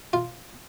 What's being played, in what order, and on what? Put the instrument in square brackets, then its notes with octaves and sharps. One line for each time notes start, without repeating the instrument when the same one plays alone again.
[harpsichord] F4